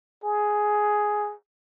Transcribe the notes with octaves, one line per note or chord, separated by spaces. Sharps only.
G#4